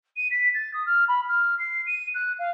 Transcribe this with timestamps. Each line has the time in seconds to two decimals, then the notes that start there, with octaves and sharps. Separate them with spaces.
0.17 D#7
0.31 B6
0.54 A6
0.74 D#6
0.86 F6
1.08 B5
1.29 F6
1.59 C7
1.87 D#7
2.14 F#6
2.39 F5